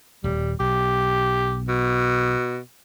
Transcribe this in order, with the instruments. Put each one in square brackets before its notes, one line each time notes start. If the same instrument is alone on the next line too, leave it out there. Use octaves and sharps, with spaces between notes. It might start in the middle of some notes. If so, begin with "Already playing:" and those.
[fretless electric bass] D#1 [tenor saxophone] G3
[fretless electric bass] B1 [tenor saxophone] G4
[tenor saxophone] B2